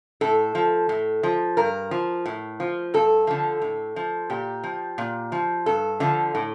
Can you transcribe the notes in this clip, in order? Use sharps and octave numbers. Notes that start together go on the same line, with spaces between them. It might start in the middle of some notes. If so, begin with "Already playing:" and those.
A2 A4
F3
A2
F3
G2 A#4
F3
A2
F3
G2 A4
D3 F3
A2
F3
A#2 G4
F3
A#2
F3
G2 A4
D3 F3
A2